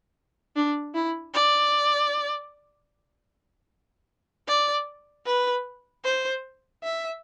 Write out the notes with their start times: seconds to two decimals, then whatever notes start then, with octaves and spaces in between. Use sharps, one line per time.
0.56 D4
0.95 E4
1.34 D5
4.48 D5
5.26 B4
6.04 C5
6.83 E5